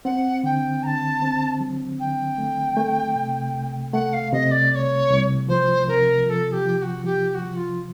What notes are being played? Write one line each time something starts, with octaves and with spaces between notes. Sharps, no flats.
C4 F#5
D3 G5
D3 A5 A#5
C4
F#3
D3 G5
A3
A3
C3
C2
A3 F#5
F5
C3 D#5
D5
C2 C#5 D5
C2
F3 C5
C3 A#4
F3 A4 A#4
G4
F3
G4
F#4
F3 G4
G4
F#4
F3
F4